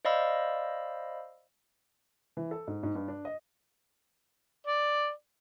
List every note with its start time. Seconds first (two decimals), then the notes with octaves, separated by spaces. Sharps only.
0.05 C5 D5 D#5 F5 B5 E6
2.37 E3
2.51 A4
2.67 G#2
2.83 G#2
2.95 G2
3.08 D4
3.25 D#5
4.67 D5